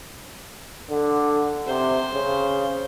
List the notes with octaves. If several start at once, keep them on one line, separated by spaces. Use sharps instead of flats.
D3
C3 C5
C#3